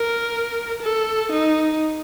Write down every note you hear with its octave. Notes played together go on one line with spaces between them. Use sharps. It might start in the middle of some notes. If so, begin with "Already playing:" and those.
Already playing: A#4
A4
D#4